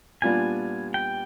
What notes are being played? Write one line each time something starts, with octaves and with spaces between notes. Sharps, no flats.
A#2 G3 B3 D4 F4 G#5
G5